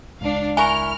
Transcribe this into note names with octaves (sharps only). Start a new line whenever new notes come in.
C#2 D4 F5
E4 A#4 G#5 C#6 F6